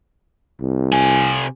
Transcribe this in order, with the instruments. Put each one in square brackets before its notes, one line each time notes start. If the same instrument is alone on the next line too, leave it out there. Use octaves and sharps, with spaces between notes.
[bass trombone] C2
[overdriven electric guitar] C3 G#5